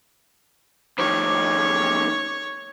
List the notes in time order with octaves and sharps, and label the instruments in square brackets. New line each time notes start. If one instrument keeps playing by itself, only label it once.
[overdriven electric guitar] F2 D#3 [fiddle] C#5 [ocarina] D6